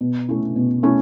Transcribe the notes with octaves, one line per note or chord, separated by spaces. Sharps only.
B2
A3 C#4 E4
B2
A3 C#4 E4